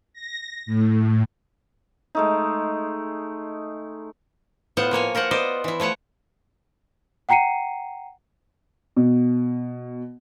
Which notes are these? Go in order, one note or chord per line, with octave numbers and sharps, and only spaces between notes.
A#6
A2
G#3 A3 D#4
A2 B3 F4 C5 F#5
F3 A#3 C#5 G#5
F4 A#4 C5 F#5
B3 C5 D5 D#5
E3 E4
F3 A3 C#5 F#5
F#5 G5 A#5 C7 C#7 D#7
B2